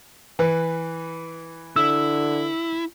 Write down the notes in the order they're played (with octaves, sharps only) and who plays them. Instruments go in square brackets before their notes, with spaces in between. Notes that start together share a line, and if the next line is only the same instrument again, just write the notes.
[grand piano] E3 B4
[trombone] D3 [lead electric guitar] E4 [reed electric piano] E6